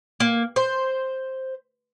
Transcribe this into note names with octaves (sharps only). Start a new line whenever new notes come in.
A#3
C5